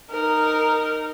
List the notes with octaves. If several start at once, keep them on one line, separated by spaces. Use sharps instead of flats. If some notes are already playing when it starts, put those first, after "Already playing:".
D#4 A#4